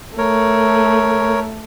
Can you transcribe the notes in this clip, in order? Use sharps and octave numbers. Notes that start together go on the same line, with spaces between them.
A3 A#4 C#5